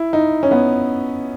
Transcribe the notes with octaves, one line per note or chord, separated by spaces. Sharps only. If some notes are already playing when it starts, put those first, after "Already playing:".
Already playing: E4
D#4
C#4
B3